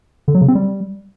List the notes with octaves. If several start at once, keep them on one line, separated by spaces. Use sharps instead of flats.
D3
F#3
C#3
C4
G3